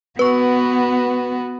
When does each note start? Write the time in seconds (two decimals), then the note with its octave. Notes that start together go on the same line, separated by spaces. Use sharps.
0.19 B3 F#4 B4 C#6